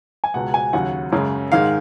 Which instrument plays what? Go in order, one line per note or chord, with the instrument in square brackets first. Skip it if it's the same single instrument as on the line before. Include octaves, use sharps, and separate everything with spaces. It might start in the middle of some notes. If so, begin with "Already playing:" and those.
[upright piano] G#5
C#2 B2 G#3 F#5
G#5
D#2 C#3 F#3 F#5
F#2 C#3 G#3
G#2 D#3 G#3 F5